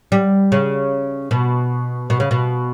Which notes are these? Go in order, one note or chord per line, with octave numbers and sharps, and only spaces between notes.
G3
C#3
B2
B2
C#3
B2